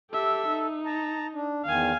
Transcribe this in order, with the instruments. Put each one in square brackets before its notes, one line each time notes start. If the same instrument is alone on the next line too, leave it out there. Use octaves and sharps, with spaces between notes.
[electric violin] G4 E5 [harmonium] A4
[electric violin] D#4
[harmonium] A5 A#5
D4
[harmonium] E2 D#3 [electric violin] F5 G#5